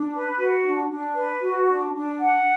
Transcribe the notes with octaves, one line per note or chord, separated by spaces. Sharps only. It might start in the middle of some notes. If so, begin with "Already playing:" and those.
Already playing: D4
B4
F#4
D4
D4
B4
F#4
D4
D4
F#5